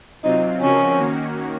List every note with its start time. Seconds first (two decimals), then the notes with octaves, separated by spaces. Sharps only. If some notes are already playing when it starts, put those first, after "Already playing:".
0.23 C3 F#3 C4 D#4 F4
0.60 C#3 F3 C4 C#4 F#4 A#4
0.97 D#3 A#3 C#4 F#4